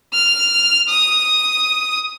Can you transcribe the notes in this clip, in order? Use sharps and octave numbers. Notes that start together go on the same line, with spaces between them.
F6
D#6